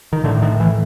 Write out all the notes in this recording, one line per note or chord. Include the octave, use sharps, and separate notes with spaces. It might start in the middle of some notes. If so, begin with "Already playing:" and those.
D#3
A2 D3
D#3
E3